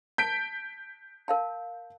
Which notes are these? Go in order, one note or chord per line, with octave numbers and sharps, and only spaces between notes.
A5 G6 B6 D7
A#4 F5 A5